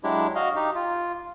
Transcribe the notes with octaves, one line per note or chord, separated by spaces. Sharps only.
F#3 G#3 D4 E4 G4
F#4 D#5 F5
D#4 G4
F4